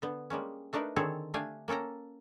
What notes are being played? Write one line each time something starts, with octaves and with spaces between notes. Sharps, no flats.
D3 B3
G3 G#3 A#3 C#4
A3 D4 D#4 A#4 B4
D3 D#3 C4 G#4 A4 C#5
A3 D4 G4 F5 G5 G#5
A#3 C#4 A4 G5 A#5